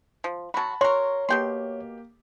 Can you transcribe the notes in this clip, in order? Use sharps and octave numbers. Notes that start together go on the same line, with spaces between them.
F3
F#3 F#4 A5 B5
F#4 A#4 C#5 C6
B2 A#3 G4 G5 C6